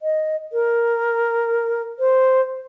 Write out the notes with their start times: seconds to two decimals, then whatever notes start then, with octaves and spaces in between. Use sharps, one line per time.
0.01 D#5
0.53 A#4
1.99 C5